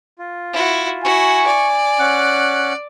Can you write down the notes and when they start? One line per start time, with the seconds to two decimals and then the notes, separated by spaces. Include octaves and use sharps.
0.19 F4
0.53 E4 F#4
1.04 E4 F#4 G#5 C#6
1.47 D5
1.99 C#4 F#5 F#6